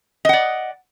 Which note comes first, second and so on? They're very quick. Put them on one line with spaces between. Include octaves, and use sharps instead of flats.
D#5 F#5 D5